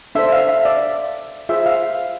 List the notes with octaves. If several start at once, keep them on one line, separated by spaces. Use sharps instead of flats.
D4 A4 C5 E5
F5
E5
D5
F4 G#4 C5 E5
F5